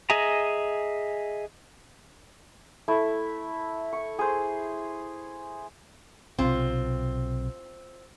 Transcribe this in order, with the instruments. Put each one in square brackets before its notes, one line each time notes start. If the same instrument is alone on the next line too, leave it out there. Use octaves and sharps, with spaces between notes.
[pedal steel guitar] G#4 D#5 E5 G#5 A#5
[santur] A3 E4
C#6
G#4 C5
[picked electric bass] B1 C3 [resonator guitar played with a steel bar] C4 F4